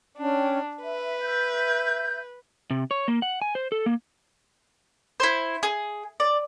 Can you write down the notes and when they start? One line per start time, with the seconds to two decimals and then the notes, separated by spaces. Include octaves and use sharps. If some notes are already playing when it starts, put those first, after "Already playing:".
0.18 C#4 D4 G5
0.82 B4 E5
1.21 E5 G6
2.71 C3
2.91 C#5
3.08 A#3
3.22 F#5
3.42 G#5
3.55 C5
3.72 A4
3.86 A#3
5.20 E4 C5
5.63 G#4
6.20 D5